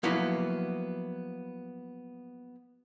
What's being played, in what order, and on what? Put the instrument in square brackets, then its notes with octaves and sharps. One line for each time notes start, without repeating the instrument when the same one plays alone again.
[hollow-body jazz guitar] F3 F#3 A#3 B3 E4